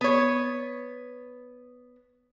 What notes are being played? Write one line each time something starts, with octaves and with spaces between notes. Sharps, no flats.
B3 C#5